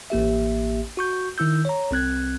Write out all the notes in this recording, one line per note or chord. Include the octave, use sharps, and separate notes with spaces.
A1 A#3 G4 E5
F#4 C#6 G6
D#3 E4 E6 G6
C#5 A#5
C2 C4 F#6 G#6